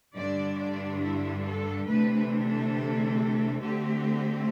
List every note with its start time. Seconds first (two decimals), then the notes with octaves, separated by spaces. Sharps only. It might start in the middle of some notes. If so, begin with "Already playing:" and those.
0.15 G2 D3 G3 D4 D5
0.58 D5
1.02 E4
1.45 A4
1.88 D2 C3 E3 A3 D4 B4
2.46 A4
3.61 D2 D3 A3 C4 G4